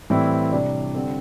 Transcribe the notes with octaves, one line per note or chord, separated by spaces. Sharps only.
A2 E3 G3 C4 E4
C3 G3 D4
D3 G3 C4 A4